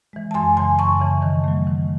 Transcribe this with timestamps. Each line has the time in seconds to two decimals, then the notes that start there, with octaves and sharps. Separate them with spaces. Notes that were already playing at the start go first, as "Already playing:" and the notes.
0.13 E3 G#3
0.31 A5
0.34 F#2 G#5 C6
0.56 C#3 E3 G#5 C6
0.78 F#2 A5 C#6
1.00 C#3 E3
1.22 D#3
1.44 F#3 A3
1.67 D#3